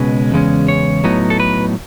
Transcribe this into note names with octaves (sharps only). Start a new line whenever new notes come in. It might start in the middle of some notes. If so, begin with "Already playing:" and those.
Already playing: C#2 B2 G#3 C#4 B4
E2 C#3 G#3 C#4
C#5
A2 F#3 B3 D#4
A4
B4